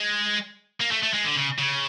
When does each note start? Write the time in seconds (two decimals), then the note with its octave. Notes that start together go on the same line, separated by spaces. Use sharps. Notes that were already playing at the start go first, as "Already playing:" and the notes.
Already playing: G#3
0.80 A#3
0.91 A3
1.03 A3
1.14 G#3
1.25 D3
1.36 C#3
1.59 C#3